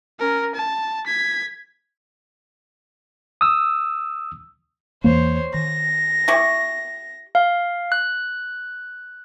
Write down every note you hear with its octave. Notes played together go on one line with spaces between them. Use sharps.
C#4 A#4
A5
G#6 B6
D#6 E6
E2 E3 A#3 C5 C#5
D#3 A#6
E4 G4 C#6
F5
F#6